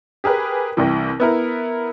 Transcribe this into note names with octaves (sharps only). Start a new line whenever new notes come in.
G4 G#4 A#4 B4
C2 C3 E3
B3 E4 A#4